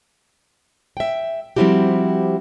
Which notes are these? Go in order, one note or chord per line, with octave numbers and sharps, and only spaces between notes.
E5 G5
F3 G3 C4 E4 F#4 G4